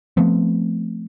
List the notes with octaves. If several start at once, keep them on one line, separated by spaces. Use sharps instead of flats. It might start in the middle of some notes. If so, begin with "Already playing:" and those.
F3 A3 B3 C4